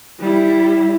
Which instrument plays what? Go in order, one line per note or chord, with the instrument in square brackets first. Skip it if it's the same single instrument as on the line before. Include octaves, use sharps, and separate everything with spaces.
[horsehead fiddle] G3 E4